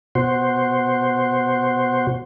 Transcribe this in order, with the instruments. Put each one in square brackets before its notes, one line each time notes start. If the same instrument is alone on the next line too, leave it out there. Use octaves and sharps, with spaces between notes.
[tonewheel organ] B2 F#4 C5